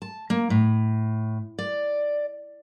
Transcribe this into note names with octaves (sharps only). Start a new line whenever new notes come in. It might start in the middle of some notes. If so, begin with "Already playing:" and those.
A5
A#3
A2
D5